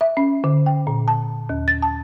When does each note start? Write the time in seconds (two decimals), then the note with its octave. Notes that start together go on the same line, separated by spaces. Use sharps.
0.01 E5
0.17 C#4
0.44 D3
0.66 G5
0.87 A#2
1.08 A5
1.49 D#2
1.68 A6
1.82 A5